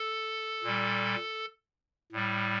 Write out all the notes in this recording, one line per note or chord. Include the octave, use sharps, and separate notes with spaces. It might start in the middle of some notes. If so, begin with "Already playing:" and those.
Already playing: A4
A#2 G3
A2 G3